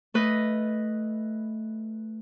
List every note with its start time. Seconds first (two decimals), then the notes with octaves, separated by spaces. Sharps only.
0.14 A3 B4 D#5